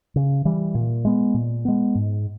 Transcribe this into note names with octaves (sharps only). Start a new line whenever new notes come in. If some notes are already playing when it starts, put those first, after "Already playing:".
C#3
E3 G3
A#2
G#3 B3
A#2
G#3 B3
G#2